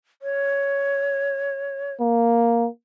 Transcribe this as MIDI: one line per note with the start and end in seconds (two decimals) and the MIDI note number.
0.22 1.93 73
2.01 2.67 58